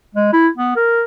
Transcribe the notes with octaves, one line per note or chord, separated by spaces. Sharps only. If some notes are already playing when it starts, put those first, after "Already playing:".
G#3
E4
B3
A#4